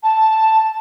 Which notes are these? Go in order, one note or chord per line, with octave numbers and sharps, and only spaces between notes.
A5